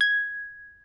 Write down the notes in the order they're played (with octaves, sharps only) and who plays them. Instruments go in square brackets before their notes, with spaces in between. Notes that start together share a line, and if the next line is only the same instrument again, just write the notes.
[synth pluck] G#6